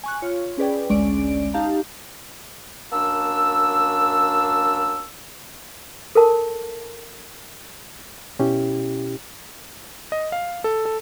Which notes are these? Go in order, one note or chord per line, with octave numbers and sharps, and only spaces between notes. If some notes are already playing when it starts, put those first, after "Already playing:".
G#5 C#6 F#6
F4 C#5
C#4 G#4 B4 D5 G5
A1 D2 G#3 C#4 D5 D7
D#4 G4 F5 A5 A#5
F#2 A#3 D4 A5 E6
A4 A#4 A5
B2 C#4 E4 G4
D#5
F5
A4
A4